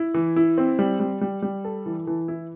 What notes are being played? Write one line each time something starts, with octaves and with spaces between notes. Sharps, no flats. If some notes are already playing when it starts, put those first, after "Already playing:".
Already playing: E4
E3
E4
C4
G3
G3
G3
G3
A4
E3
E3
E4